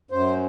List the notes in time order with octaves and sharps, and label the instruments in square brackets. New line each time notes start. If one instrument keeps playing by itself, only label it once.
[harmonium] F#2 C5